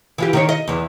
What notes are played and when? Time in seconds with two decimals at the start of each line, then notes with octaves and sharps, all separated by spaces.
0.18 E3 F4 G4
0.33 D#3 D#4 C#5
0.49 D#5
0.68 E2 E3